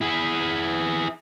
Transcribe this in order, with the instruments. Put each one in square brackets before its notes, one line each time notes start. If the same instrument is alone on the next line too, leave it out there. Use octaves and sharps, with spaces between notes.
[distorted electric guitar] E4 G#4